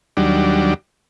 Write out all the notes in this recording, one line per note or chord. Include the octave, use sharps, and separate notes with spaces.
D#2 F#3 G3 D4